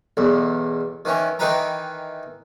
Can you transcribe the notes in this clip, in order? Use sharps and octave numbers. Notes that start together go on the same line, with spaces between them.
B1 E2
D#3 E3 C#4
D#3 E3 D#4 B4 G5 A#5